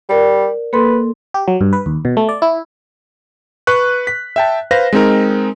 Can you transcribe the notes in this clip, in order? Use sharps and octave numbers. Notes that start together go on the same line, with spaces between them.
G3 A#4 D5
A#3 A4 B4 C6
G4
F#3
G2
B4
D#2
B2
A3
D5
E4
B4 C#6 F#6
B6
E5 G5 A5
B4 C5 F5 A#6
G#3 C4 D#4 A#4